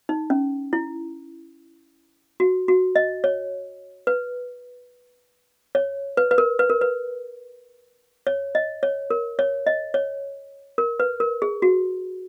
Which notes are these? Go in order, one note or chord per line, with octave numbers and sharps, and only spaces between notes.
D#4
C#4
E4
F#4
F#4
D#5
C#5
B4
C#5
B4
B4
A#4
B4
A#4
B4
C#5
D#5
C#5
A#4
C#5
D#5
C#5
A#4
B4
A#4
G#4
F#4